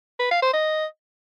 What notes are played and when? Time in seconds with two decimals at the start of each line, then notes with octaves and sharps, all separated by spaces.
0.20 B4
0.31 F5
0.42 C5
0.53 D#5